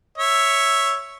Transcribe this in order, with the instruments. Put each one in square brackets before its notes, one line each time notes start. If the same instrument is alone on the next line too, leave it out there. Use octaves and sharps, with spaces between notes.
[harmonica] C#5 E5